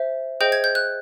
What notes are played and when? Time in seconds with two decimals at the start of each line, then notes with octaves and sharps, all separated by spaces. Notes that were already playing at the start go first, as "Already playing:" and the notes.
Already playing: C5 E5
0.41 G#4 C5 D#5 G5 G6
0.52 G#6
0.64 G6
0.75 F#6